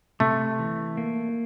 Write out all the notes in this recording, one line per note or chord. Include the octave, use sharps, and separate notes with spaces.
C3 A3
E3
A#3